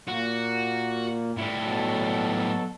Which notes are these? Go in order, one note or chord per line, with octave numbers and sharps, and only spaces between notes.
A#2 A#3 F#4
A2 G3
B2 F#3 A4